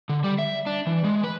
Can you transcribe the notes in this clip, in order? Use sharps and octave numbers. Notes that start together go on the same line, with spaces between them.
D3
G3
E5
D4
E3
G#3
B4